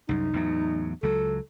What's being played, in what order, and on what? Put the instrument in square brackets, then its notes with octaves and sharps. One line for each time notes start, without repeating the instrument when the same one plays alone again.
[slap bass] C2 F#2 [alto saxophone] D#4
[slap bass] E2 A2 F#3
[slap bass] C#2 F#3 [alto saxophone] A4